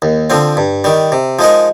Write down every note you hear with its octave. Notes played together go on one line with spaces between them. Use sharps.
D#2
D3 F3 C4
G2
D#3 G3
C3
F3 G#3 D#4 A#4